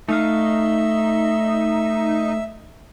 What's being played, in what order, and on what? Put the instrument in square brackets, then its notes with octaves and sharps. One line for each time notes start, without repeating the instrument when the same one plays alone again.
[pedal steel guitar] A3 F5 [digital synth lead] D#4 [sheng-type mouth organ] E5